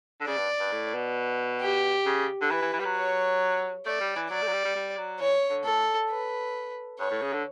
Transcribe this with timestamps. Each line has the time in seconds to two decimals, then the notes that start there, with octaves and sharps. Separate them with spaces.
0.20 D3
0.27 C#3 D5
0.37 G2
0.60 G2
0.72 A2
0.94 B2
1.61 G4
2.06 C#3
2.42 D3
2.51 E3 B4
2.62 E3
2.73 E3
2.79 G3
2.85 F#3
2.96 C#5
3.86 A3 D5
4.00 G3
4.16 E3
4.30 F#3 D5
4.42 A3
4.47 F#3
4.53 G3
4.65 G3
4.76 G3
4.97 F#3
5.20 E3 C#5
5.50 D3
5.65 A2 A4
6.10 B4
6.99 G2 C#5
7.11 A2
7.22 C#3
7.33 D3